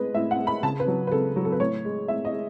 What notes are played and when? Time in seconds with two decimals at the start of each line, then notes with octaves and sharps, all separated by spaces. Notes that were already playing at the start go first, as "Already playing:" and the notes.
Already playing: A2 G#3 B4 D#5
0.14 A2 E5
0.31 F#5
0.39 G#3
0.47 B5
0.63 C#3 A5
0.80 B4
0.87 F#3
1.07 B4
1.12 C#3 A4
1.36 F#3
1.45 A4
1.52 B4
1.60 A2 C#5
1.85 G#3
2.08 A2 E5
2.25 D#5
2.33 G#3